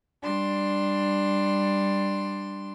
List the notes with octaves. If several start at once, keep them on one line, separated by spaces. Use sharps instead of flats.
G3 D4 C6